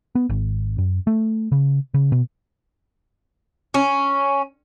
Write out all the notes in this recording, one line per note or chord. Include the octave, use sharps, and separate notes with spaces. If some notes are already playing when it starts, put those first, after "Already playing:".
B3
G#1
F#2
A3
C#3
C#3
B2
C#4